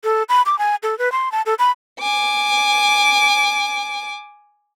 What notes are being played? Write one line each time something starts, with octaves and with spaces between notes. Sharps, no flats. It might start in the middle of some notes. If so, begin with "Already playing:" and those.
A4
B5
D6
G#5
A4
B4
C6
A5
A4
B5
G#5 D6